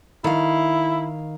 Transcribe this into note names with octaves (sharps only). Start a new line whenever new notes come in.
D#3 E4 F5